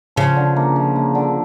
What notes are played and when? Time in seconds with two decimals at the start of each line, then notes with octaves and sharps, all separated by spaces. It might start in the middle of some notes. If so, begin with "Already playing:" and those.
0.16 C#3 F3
0.36 D3
0.56 A#3
0.76 F3
0.96 A#3
1.15 D3